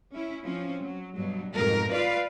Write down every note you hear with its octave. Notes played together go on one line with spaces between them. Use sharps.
C#4 E4
F3 C4 C#4
F#3
G2 B2 F#3 G3
F2 G#2 B2 A#4
F4 B4 D5 F5